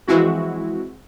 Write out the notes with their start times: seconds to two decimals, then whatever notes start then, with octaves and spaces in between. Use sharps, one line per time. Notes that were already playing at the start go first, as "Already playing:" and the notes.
0.08 E3 F3 G#3 C4 E4 F#4